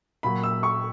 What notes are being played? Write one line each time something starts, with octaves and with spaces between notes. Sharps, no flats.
A#2 F#3 B5
E6
C#6